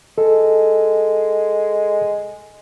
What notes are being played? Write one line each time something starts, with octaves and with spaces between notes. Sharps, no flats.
G#3 A4